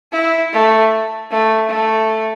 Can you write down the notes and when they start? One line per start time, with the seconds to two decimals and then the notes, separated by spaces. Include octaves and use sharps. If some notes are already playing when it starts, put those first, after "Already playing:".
0.12 E4
0.52 A3
1.31 A3
1.69 A3